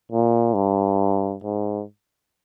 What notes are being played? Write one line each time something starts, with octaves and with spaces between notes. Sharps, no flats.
A#2
G2
G#2